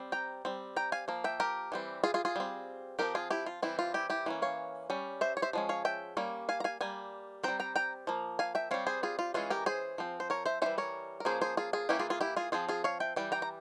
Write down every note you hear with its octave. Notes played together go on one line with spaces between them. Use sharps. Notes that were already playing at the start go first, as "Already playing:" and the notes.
Already playing: G3 C4
G5 A#5
G3 C4
G5 A#5
F5 G#5
F3 A#3
E5 G5
G4 A#4
E3 G3 C4
F4 G#4
F4 G#4
F4 G#4
G3 C4
F3 G#3 C4 G4 A#4
F4 G#4
E4 G4
F4
E3 G3 C4 E4
F4
E4 G4
E4 G4
E3 A#3 C#4
C#5 F5
G3 C#4
C5 E5
C#5
C5 E5
F3 G#3 C#4
C#5 F5
E5 G5
G3 A#3 C#4
F5 G#5
A#5
F5 G#5
G3 A#3 G#5
G3 C4 G5 A#5
G5 A#5
G5 A#5
F3 A#3
F5 G#5
E5 G5
G3 C4 C#5 F5
G#4 C5
F4 G#4
F4
E3 G#3 C#4 F4 G#4
G4 A#4
G#4 C5
F3 C4
C5
A#4 C#5
C5 E5
E3 G3 C#4 C5 E5
A#4 C#5
A#4
F3 A#3 C#4 G#4 C5
G#4 C5
F4 G#4
F4 G#4
E3 A#3 C#4 E4 G4
F4 G#4
F4 G#4
E4 G4
F4 G#4
F3 C4 F4 G#4
F4 G#4
C#5 F5
E5 G5
E3 G3 G5
G5 A#5
A#5